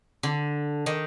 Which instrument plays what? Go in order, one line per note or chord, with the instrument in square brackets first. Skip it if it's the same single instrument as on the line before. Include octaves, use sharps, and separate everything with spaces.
[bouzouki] D3
D#3